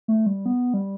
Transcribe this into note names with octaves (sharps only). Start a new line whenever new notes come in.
A3
G3
B3
G3